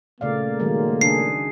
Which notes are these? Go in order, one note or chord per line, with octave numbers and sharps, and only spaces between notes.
A#2 C#3 A3 A#3 D5 F5
D#3 F#3 G#3
C#3 D4 G#4 C7